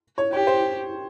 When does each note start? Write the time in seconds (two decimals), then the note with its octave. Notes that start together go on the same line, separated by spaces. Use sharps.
0.18 C#5
0.33 G4 C#5
0.47 C5